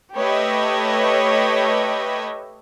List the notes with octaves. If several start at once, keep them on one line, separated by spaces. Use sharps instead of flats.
A3 G4 B4 C#5 D#5 E5